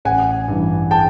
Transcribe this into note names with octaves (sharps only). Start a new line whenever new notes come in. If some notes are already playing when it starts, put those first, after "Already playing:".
A1 F#5 G#5
G2 E3
G5 A5